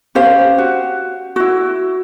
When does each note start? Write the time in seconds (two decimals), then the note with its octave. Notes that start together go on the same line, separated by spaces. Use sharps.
0.15 C#4 G4 C5 F5
0.58 F#4
1.36 E4 F#4